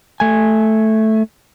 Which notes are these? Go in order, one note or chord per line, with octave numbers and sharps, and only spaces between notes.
A3 G#5